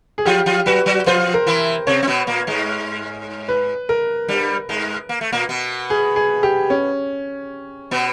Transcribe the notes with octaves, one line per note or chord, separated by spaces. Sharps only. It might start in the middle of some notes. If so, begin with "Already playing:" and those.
G#4
F3 F4 G4
F3 F4
F#3 F#4 B4
F#3 F#4
F3 F4 C5
A#4
E3 E4
C3 C4 C#5
C4
B2 B3
A#2 A#3
G#2 G#3
B4
A#4
G2 G3
G#2 G#3
A#3
A3
A#2 A#3
B2 B3
G#4
G#4
G4
C#4
B2 B3